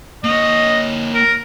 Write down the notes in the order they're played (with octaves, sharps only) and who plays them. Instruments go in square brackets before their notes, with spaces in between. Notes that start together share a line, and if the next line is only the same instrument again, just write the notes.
[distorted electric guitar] A#3 C#5 [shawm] D#5
[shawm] A#4